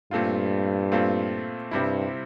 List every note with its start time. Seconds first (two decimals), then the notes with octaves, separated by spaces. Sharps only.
0.11 G2 A#2 A3 C4 F4
0.92 A#2 A3 C4 F4
1.71 G2 C3 G3 C4 E4